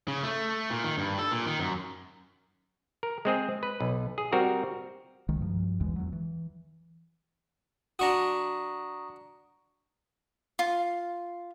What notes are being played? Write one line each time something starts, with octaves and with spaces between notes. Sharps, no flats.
C#3
A3
A#2
D#3
G2
A4
A#2
D#3
F#2
A#4
G#3 C4 G#4
B4
B1
G#4
G3 C4 F#4 A#4
C2 D#3 G#3
G2 F3
A#1 E2 E3 G#3
E2 F#3
E3
D4 F#4 A#5 C#6 D#6
F4